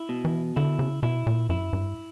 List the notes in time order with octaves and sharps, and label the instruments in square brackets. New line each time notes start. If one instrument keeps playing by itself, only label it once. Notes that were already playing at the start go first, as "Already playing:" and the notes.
Already playing: [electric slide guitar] E4
B2
[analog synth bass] E3
[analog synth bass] D3 [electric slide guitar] E4
[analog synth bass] C#3
[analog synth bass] B2 [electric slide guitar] E4
[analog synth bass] A#2
[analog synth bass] F#2 [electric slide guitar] E4
[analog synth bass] G2